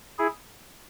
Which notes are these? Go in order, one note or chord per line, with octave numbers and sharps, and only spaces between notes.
E4 G#4